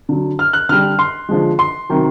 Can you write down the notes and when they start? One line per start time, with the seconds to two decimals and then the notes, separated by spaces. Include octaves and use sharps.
0.09 D3 F#3
0.39 F6
0.53 F#6
0.69 D3 G3 F6
0.99 C6
1.29 D3 F3 G#3
1.59 C6
1.89 C3 D#3 F#3